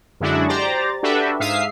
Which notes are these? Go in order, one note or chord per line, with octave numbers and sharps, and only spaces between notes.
F#2 D3 G#3 D4 E4 F#4
G4 C5 D5 A#5 A6
D4 F#4 G4 A4 B4 E5
G#2 E5 F5 D#6 C7